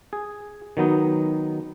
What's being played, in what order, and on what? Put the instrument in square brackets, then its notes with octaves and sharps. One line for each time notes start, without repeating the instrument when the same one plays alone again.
[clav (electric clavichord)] G#4
D#3 F#3 B3 D#4